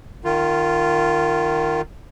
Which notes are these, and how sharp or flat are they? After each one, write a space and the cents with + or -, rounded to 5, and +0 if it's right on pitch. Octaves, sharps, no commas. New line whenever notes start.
D#3 -15 F4 -5